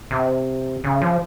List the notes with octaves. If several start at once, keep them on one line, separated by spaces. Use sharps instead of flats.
C3
C#3
F3